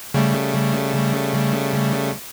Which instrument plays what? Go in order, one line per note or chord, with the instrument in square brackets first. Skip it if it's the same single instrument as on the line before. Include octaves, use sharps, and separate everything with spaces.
[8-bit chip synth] C#3 G3 A3